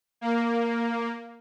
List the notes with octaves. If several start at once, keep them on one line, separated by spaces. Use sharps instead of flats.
A#3